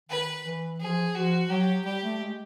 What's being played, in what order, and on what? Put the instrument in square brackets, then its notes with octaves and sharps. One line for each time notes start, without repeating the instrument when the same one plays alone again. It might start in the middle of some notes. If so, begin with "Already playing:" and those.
[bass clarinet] D#3 [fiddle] B4
[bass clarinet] E3
[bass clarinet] F3 [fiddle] G#4
[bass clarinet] F3 [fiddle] F#4
[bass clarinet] F#3 [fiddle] G4
[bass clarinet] G3 [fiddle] G4
[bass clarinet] A3
G#3